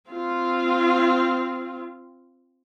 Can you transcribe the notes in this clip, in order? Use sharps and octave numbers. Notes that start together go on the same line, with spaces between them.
C4 F4